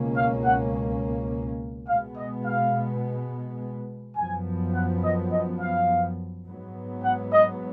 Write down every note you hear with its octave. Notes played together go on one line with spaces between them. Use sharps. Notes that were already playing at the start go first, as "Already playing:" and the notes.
Already playing: C#2 B2 A#3 C#4
F5
F#5
B2 G#3 B3 F5
D#5
F5
F#2 F3 B3 G#5
F#5
D#5
D#5
F5
G#2 F#3 B3
F#5
D#5